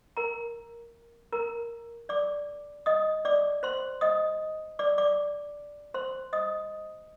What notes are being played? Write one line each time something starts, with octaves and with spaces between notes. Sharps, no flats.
A#4 A#5
A#4 A#5
D5 D6
D#5 D#6
D5 D6
C5 C6
D#5 D#6
D5 D6
D5 D6
C5 C6
D#5 D#6